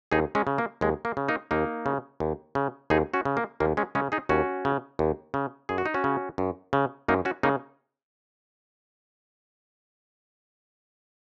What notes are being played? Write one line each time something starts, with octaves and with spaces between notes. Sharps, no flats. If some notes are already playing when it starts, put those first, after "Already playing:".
D#2 D#4 G#4
G#3 C#4
C#3
A#3
D#2 G#3
A#3
C#3
A#3 D#4
D#2 A#3 D#4
C#3
D#2
C#3
D#2 D#4 G#4
C#4 F#4
C#3
A#3
D#2 A#3
G#3 C#4
C#3 G#3 C#4
D#4 G#4
D#2 C#4 F#4
C#3
D#2
C#3
F#2 G#4
F#4
D#4
C#4 F#4
C#3
F#2
C#3
F#2 A#3 D#4
C#4 F#4
C#3 A#3 D#4